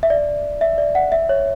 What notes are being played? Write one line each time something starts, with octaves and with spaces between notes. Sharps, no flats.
E5
D5
E5
D5
F#5
E5
C#5